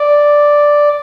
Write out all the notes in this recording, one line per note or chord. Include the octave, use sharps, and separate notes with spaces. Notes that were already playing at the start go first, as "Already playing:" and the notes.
Already playing: D5